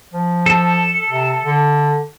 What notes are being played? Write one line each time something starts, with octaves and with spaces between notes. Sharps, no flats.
F3
A4
C3
D3